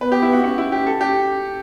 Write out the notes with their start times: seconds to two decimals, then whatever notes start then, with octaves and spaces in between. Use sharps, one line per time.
0.01 B3 B4
0.12 G4
0.22 E4
0.33 F#4
0.44 C#4 F#4
0.58 E4
0.72 G4
0.86 A4
1.01 G4